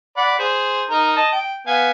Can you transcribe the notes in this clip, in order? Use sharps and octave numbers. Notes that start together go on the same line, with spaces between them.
D5 F#5 B5
G#4 C5
D#4 A#4 A#5
D#5 A5
G5
B3 F5 G#5